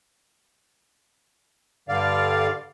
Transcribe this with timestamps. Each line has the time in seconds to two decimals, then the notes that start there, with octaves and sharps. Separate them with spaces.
1.89 G2 D3 D5 F5